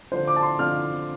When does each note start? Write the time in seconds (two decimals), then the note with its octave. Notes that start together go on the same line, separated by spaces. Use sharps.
0.12 D3 F3 D4 C5
0.27 D6
0.36 A5
0.43 C6
0.59 D3 F3 D4 F6